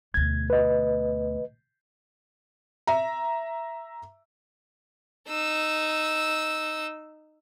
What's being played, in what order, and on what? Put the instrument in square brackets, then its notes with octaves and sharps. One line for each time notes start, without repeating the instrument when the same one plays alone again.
[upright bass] D2 B2 [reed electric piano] G#6
[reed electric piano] B4 D#5
[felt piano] E5 A#5
[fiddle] D#4 E6